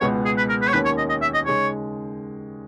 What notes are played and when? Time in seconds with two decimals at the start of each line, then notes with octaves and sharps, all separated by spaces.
0.01 C#2 B2 G#3 B3 C#5
0.25 G#4
0.37 B4
0.49 A#4
0.62 B4
0.68 C#5
0.73 D#2 D#3 A#3 C#4 B4
0.85 C#5
0.98 D#5
1.09 D#5
1.22 E5
1.34 D#5
1.46 C#3 G#3 D#4 G#4 C#5